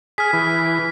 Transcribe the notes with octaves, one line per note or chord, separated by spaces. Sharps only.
G#4 F6 B6
E3